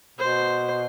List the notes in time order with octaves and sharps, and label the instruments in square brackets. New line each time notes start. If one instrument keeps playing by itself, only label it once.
[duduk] B2 [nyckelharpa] C5